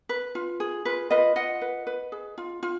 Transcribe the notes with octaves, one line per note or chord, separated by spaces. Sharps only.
B4
F4
G#4
F4 B4
F4 B4 D#5
F4 D#5 F#5
B4
B4
G#4
F4
F4